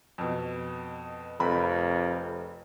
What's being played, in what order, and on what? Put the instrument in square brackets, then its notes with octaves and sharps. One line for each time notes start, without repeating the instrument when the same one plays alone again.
[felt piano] F2 B2
[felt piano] F1 B5 [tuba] F2